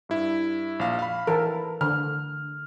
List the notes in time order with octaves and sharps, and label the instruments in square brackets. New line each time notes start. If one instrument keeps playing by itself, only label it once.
[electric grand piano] G2 E4
A#1 F5
F5 B5
[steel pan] E3 A4 A#4
[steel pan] D3 [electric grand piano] F6